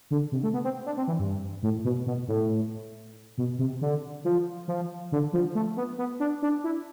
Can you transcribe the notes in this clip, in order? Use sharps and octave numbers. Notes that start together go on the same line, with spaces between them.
D3
C3
A3
B3
C4
D4
C4
E3
G2
A2
B2
B2
A2
B2
C3
D3
F3
F3
D3
F3
A3
B3
B3
D4
D4
E4